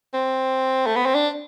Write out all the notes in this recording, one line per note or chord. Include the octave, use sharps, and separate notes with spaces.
C4
A3
B3
C4
D4